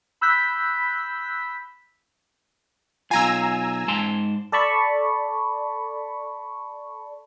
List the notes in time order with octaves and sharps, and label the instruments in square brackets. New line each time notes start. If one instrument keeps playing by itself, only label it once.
[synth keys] B5 E6 F#6 G6 B6
[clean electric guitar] B1 F4 [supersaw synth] G#5 A#5 E6
[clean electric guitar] G#2 A5 C6
[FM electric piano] A4 D5 A5 B5 C#6